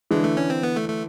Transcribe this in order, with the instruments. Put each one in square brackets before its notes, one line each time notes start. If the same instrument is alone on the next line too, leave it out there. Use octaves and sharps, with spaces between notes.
[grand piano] D3 E3 [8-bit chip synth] G#3
[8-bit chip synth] A3
C#4
C4
B3
A3
A3